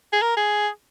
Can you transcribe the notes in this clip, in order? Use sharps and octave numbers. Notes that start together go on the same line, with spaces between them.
G#4
A#4
G#4